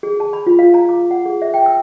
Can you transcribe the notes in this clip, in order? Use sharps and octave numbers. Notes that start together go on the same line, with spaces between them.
G#4
A5
B5
F4
F5
A#5
D6
F#5
G#4
E5
G5
E6